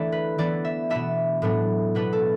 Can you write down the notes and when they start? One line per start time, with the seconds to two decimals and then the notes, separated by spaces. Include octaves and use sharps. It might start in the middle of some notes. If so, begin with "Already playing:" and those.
Already playing: E3 A3 D4 E4 D5 E5
0.12 B4
0.38 E3 B3 E4 D5
0.65 E5
0.90 B2 B3 D4 E5
1.42 A2 F#3 B3 D4
1.95 B2 B3 D4 B4
2.13 A4